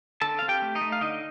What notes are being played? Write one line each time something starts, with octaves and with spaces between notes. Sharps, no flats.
D3 A4 A5
C4 F5
G4 G5
A3
D#4 D#5
A3
F5
D3 D#4 D#5